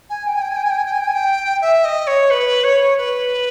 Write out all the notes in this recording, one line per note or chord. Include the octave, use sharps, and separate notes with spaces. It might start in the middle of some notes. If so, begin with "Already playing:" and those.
G#5
G5
G#5
G5
G#5
G5
G#5
G5
G#5
G5
G#5
G5
G#5
G5
E5
D#5
C#5
B4
C#5
B4